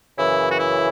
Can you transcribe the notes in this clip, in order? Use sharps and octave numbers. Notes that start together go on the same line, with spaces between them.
F#2 C#3 E3 E4
F#4
E4